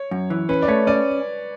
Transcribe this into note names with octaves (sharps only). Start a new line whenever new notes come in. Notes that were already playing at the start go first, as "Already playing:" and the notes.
Already playing: C#5
F#2
E3
C#4 B4
D5
A3 C#5
C#4 D5